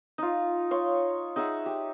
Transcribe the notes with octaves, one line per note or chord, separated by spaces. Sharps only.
D#4 F4
C#5 F5 C6
D#4 G#4 E5 F#5
G4